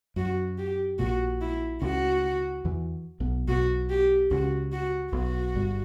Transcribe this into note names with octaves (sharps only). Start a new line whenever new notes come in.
F#2 F#4
G4
A#1 A#2 F#4
E4
C#2 C#3 F#4
E2 E3
B1 B2
B1 B2 F#4
G4
C#2 C#3 F#4
F#4
B1 B2 F#4
G1 G2